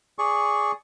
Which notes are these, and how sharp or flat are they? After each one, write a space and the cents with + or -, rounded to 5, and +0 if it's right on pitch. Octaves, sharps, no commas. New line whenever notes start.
G#4 +0 D5 -10 C#6 +0